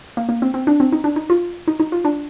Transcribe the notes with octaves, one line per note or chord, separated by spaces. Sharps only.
A#3
A#3
C4
C4
D4
C4
D#4
D4
D#4
F4
D#4
D#4
F4
D4